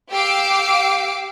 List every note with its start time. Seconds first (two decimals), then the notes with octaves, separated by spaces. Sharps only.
0.11 G4 F5 D6 E6 C7 D7